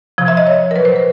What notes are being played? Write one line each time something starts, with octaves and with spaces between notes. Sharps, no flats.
C3 F3
E5
D#5
C#5
A#4
A#2 F#3 B4
C5
A#4